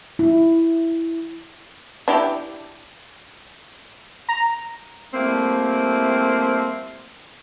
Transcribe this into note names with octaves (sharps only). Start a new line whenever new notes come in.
E4
D4 E4 G4
A#5
G3 A3 A#3 C4 E4